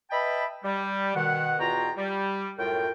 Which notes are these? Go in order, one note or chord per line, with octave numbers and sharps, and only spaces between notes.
B4 D#5 E5 G5 A5 B5
G3
B2 D#3 F#5
E2 B2 F4 F#4 G5 A#5
G3
F#2 A2 F4 A#4 G5